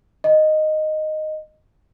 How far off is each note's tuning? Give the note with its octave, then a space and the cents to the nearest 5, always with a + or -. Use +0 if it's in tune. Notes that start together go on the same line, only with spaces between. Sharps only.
D#5 -5